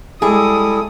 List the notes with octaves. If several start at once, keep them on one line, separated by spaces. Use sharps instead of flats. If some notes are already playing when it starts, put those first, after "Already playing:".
G3 G#3 E4 G#4 A4 D#6